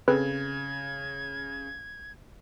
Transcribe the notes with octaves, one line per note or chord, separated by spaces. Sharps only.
C#3 C4 G#4 A4 B4 G#6